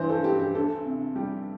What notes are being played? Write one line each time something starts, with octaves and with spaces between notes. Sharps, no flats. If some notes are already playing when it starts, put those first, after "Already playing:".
Already playing: G2 E3 C5
A4
G2 G4
G4
D2 A4
C3
G3 G4